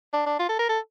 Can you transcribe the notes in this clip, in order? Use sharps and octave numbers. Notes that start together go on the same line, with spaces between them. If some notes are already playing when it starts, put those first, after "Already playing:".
D4
D4
F4
A4
A#4
A4